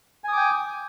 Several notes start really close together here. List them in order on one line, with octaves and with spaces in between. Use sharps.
G#5 D#6 D6 G5